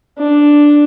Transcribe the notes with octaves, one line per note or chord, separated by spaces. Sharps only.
D4